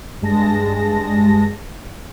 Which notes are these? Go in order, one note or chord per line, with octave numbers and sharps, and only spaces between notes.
G2 G#3 A5 A#6